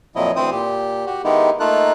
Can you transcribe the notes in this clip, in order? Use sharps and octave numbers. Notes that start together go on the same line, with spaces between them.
F2 A#2 F3 F#3 E4 D#5
D2 E3 C4 E4 C5 D#6
A#2 G4
F#4 G4
D#3 G#3 B3 D#4 E4 G4
A3 A#3 D#4 F4 A4 F#6